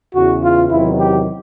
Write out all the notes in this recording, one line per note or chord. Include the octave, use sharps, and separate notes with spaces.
E2 C#3 E3 F#4
F4
E2 C3 D#3 F#3 E4
G4